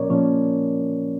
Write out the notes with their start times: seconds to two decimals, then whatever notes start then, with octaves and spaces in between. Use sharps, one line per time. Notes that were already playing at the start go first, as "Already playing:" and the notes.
Already playing: A#2 F3 A#3 C#4 A#4 C#5 D5
0.10 A#2 F3 A#3 C#4 C#5